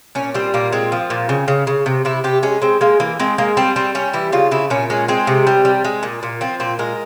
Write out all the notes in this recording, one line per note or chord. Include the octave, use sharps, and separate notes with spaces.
A#2 C#4
G3 C4
A#2 A#3
G#3 C4
F3
A#2
C#3
C#3
C#3
C3
C3 E4
C3 G4
G#3 C#4
G#3 C4
G#3 A#3
E3 A#3
G#3 C4
G#3 A#3
G3 C4
G3 C4
G3 C#4
E3 E4
C#3 F4
C#3 E4
A#2 C#4
G#3 C#4
G#3 C4
C3
G3
G3
G#3
A#2
A#2
F3 C4
A#2 C4
G#3 A#4